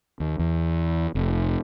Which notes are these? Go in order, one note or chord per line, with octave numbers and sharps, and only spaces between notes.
D#2
E2
F1